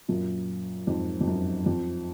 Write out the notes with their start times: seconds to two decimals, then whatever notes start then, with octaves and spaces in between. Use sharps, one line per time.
0.08 F#2 A#2
0.87 F2 G#2
1.21 F2
1.27 F#2
1.66 F2